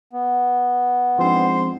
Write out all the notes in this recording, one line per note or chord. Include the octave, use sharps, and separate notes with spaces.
B3
G#2 F3 C4 D4 C5 C6